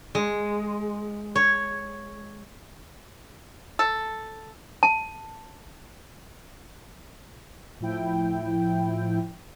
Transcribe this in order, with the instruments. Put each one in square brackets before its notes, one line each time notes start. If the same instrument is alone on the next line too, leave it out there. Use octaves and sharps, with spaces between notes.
[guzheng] G#3
C#5
[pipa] A4
[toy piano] A5
[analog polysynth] A2 F3 E4 G5